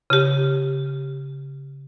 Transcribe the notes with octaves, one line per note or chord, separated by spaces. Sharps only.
C#3 G4